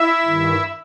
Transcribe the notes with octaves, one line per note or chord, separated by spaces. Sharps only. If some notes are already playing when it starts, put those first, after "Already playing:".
Already playing: E4 E5
G2 D#3